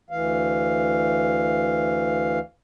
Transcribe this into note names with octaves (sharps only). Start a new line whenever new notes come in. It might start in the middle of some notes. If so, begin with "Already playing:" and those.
D2 E3 F5